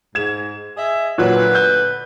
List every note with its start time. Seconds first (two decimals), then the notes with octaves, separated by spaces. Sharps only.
0.15 G#2 G#6 E7
0.76 G#4 D#5 E5
1.18 A#2 D3 F#3 B4
1.55 G6